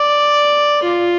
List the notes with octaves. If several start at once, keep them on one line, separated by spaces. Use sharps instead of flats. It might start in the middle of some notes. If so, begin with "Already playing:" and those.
Already playing: D5
F4